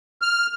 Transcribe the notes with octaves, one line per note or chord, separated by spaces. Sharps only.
F6